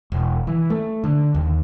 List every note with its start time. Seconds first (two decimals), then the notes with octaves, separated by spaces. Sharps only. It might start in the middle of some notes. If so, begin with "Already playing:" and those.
0.12 E1
0.47 E3
0.70 A3
1.04 D3
1.34 D#2